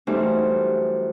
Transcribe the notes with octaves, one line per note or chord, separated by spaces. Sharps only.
F#2 E3 G3 A3 D#4 C5